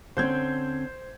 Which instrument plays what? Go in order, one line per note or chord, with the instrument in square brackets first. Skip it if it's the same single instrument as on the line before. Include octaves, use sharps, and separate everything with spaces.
[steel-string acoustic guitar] D3 C4 C#4 [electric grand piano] C5 G6 G#6